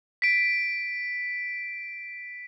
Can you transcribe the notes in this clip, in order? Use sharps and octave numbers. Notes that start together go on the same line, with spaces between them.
B6 D7